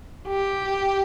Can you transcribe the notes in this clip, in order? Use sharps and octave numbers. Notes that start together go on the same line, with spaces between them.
G4